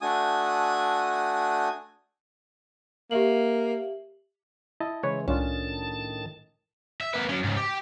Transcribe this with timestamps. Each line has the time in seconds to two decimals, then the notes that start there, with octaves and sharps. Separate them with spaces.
0.01 A3 D4 F#4 G#5 D#6
3.11 A#3 G4 E5 F#7
4.80 E4 D#5 A5
5.03 C#3 E3 G#3 B4 C#5
5.28 C2 A2 D#3 C#4 D4 F4 A5
7.01 E5
7.13 A#3 B4
7.29 F#3 C#4
7.44 C#2 G#2
7.57 G4